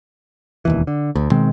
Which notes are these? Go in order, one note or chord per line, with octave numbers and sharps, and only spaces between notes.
E1 D#2 E3
D3
D2
B2 D#3 G#3 C4